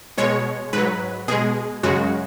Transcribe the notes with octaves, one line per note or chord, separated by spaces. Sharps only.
B2 G#3 C#5
G#2 F#3 B4
B2 G#3 G#4
F#2 C#3 G#3 F#4